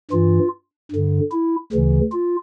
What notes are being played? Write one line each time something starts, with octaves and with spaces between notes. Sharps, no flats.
G2 E3 F4
G2 D3
E4
D2 C#3 E3
F4